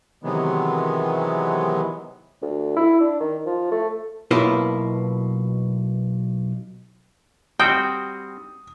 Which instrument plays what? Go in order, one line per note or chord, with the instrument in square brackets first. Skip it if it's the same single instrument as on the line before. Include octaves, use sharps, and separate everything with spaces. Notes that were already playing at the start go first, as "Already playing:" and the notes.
[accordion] C3 D#3 E3 F#3 G#3 B3
[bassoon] D2
E4
D4
D#3
F3
A3
[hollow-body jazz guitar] B1 B2 A#3 E4 F4 D#5
[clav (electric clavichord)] G3 C4 F#4 [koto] G5 [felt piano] D#6